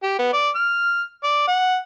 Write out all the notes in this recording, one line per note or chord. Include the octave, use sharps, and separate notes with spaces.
G4
B3
D5
F6
D5
F#5